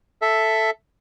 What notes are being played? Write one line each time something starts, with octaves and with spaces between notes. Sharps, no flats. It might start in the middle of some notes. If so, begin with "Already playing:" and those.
A4 E5